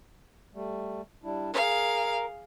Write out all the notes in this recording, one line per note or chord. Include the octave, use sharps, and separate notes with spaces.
G3 A3
G3 D4 E4
G#4 A#4 F5